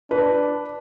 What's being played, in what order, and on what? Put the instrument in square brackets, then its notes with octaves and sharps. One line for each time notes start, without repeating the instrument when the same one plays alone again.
[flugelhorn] D4 [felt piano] B4